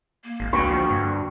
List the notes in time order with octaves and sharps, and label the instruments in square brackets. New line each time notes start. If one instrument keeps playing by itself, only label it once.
[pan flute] A#3
[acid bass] G#1
[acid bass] C#2 [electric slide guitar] D3 F#4 G5 [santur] C#6
[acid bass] F3
G2